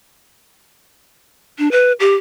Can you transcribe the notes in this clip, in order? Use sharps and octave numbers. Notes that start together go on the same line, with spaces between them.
D4
B4
G4